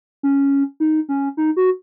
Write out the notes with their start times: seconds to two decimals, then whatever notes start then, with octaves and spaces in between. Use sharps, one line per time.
0.23 C#4
0.80 D#4
1.09 C#4
1.37 D#4
1.57 F#4